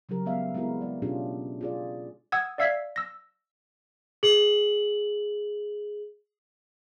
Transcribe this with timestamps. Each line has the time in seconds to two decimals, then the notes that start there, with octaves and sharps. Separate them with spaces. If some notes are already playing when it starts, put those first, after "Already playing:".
0.09 C#3 F#3 G3 G4 A#4
0.26 G#3 B3 E5 F5
0.55 G#3 B3 C4 E4 F#4 A#4
0.81 G#3 D5
1.02 B2 C#4 D4 F4 G4 G#4
1.61 F4 G#4 D5
2.32 F#5 D#6 E6 G#6
2.58 D5 E5 F5 E6 G#6 B6
2.96 E6 A#6
4.23 G#4 F#7